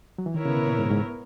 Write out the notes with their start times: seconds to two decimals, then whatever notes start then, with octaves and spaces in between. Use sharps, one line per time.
0.18 F#3
0.26 E3
0.34 D#3 B3 E4 A#4 C#5
0.45 C#3
0.57 B2
0.67 A#2
0.79 G#2
0.90 G#2